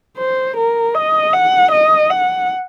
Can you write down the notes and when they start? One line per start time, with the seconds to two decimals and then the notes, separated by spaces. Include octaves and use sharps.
0.18 C5
0.57 A#4
0.95 D#5
1.33 F#5
1.72 D#5
2.10 F#5